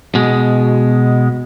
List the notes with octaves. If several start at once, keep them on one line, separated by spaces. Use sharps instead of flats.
B2 G#3